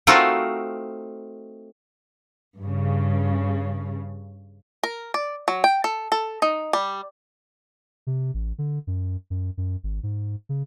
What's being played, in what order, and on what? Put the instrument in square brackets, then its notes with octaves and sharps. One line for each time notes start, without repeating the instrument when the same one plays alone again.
[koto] A3 C4 D#4 F4 F#4 A#4
[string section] G2 C#3
[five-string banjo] A#4
D5
F#3
G5
A4
A4
D#4
G3
[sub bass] C3
A1
D3
F#2
F#2
F#2
G#1
G#2
C#3